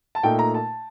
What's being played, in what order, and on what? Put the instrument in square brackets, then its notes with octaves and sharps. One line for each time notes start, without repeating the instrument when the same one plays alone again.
[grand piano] A5
A#2 A3 D#4 G5
A#5
A5